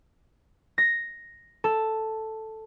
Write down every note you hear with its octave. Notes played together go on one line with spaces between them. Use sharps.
A#6
A4